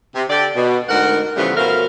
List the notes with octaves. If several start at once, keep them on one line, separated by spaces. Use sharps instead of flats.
C3
D3 G4 A4 D5
B2
D2 G#2 A#4 F#5
C#3 E3 F3 G3 A3 B3
F#2 B2 F3 A3 A#4 F5